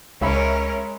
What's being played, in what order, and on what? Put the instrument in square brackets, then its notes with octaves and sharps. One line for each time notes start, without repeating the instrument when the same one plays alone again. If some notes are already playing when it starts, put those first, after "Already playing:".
[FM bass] C#2 [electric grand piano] G#3 [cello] C#4 A#4 [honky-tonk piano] C#5 E5 B5